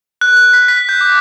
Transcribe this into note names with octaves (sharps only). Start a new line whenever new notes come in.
F#6
F#6
B6
B6
G6
D6